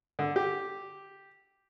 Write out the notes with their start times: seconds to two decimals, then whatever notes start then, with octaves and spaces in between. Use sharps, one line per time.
0.19 D3
0.36 G4